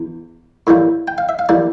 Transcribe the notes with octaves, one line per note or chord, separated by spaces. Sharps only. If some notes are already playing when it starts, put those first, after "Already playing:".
Already playing: E2
A2 E3 G3 A#3
G5
F5
E5
F5
E3 G3 A#3 D5